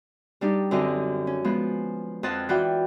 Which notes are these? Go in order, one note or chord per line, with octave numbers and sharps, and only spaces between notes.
G3 D4 D#4 G4
F#2 D3 C4 G4 D#5
C#4
F3 G#3 B3
F2 F3 D#5 F#5 A5
E3 F4 F#4 D5 F#5 G5